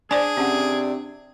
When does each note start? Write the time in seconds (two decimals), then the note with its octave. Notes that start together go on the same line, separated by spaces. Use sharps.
0.11 D4 G#4 C5 D5 G#5
0.37 C3 C#4 F#5